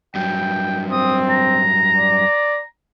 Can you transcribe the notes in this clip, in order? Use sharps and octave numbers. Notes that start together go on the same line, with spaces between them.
G2 F#3 G5
C4 D#6
A#5
D5